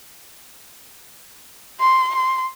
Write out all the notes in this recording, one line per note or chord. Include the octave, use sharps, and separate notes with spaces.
C6
C6